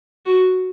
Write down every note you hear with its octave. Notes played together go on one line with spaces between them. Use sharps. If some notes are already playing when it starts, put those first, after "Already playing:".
F#4